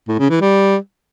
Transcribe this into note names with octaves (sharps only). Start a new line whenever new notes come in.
A2
C#3
E3
G3